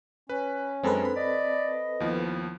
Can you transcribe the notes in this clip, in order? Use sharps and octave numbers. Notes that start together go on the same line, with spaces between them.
C#4 B4
F#2 G#3 C4 D4 A4 B4
B5
D5 D#5
D#2 F3 B3 E4